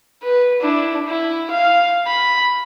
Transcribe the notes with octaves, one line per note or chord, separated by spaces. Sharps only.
B4
D4 E4
E4
F5
B5